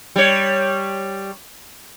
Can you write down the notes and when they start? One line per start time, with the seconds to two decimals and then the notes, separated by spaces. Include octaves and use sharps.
0.16 G3 C#5